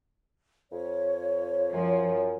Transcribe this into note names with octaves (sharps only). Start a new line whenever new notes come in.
F2 C#5
F#2 F3